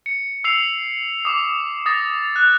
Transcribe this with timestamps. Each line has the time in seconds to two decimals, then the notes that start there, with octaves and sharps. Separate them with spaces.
0.06 C#7
0.44 E6 C7 F7
1.25 D6 D#6
1.86 D#6 A6 A#6
2.36 F#6